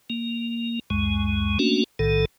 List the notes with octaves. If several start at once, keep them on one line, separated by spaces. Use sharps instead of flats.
A#3
C#2 F#2 G#3
A3 A#3 C#4 D4 F#4
B1 A2 D#3 A4